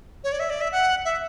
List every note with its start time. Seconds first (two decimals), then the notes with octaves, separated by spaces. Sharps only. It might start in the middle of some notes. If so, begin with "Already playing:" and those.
0.24 C#5
0.32 D5
0.40 E5
0.50 D5
0.61 E5
0.72 F#5
1.05 E5